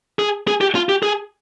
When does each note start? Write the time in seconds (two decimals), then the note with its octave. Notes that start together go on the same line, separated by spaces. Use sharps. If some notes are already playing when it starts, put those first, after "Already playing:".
0.19 G#4
0.47 G#4
0.61 G4
0.75 F4
0.89 G4
1.03 G#4